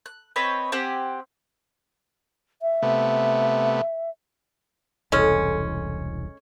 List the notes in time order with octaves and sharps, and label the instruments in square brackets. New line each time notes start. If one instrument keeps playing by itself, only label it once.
[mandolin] F#6
C4 B4 C#5 D#5
C4 G4 F#5 G#5
[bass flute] E5
[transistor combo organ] C3 A3 B3
[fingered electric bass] E1 C2 E3 [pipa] G#3 C#4 [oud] A4